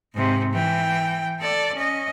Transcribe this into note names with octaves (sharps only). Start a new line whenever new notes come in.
G#2 C3
E3 G5
A4 D5
C#4 D#5